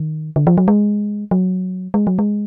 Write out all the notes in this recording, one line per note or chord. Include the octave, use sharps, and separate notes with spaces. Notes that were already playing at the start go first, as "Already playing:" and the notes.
Already playing: D#3
D3
F3
F#3
G#3
F#3
G#3
F#3
G#3